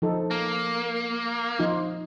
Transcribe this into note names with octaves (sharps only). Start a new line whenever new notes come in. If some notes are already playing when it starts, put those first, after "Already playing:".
F3 D#4 A4
A#3
F3 D#4 F4